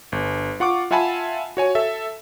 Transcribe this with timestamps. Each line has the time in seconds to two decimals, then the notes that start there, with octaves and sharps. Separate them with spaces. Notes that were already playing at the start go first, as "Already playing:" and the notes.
0.12 G1
0.60 F4 F#5 C#6 D6
0.91 F4 E5 F#5 G#5 A5 B5
1.57 F#4 C#5 G#5
1.75 A4 E5